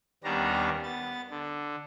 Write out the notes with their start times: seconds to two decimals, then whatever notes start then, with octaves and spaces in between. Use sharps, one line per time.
0.24 D#2 G3 B3 C#4 D4 A#5
0.83 B3 A6
1.30 D3